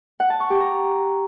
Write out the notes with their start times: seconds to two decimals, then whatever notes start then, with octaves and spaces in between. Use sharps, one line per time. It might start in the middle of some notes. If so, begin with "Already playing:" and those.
0.20 F#5
0.30 A5
0.40 C#6
0.50 G4
0.60 A#5